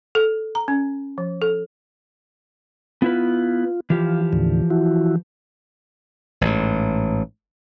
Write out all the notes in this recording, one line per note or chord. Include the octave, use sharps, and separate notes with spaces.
A4
A#5
C#4
F3
A4
B3 E4 F4 B4
E3 F3 F4 G4
D#2 A2 D3
E4 F#4
A1 G#2